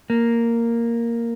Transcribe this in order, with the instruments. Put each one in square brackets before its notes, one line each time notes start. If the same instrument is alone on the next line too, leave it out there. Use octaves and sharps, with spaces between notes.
[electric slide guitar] A#3